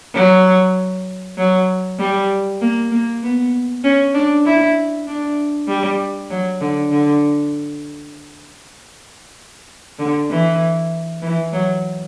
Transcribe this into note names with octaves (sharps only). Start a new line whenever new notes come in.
F#3
F#3
G3
A#3
A#3
B3
C#4
D4
E4
D4
G3
F#3
D3
D3
D3
E3
E3
F#3